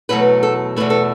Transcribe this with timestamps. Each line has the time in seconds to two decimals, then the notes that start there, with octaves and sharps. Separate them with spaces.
0.09 E2 B2 F#3 A3 B4
0.43 A4
0.76 E2 B2 F#3 A3 B4
0.90 A4